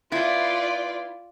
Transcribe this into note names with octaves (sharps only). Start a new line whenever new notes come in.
B3 E4 F4 D5